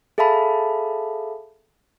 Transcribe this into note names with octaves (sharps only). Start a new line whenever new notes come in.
G#4 A4 E5 F5 A5 B5